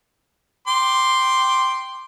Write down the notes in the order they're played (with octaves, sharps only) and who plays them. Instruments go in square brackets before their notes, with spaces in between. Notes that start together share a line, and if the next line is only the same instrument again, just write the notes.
[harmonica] G5 C6 D6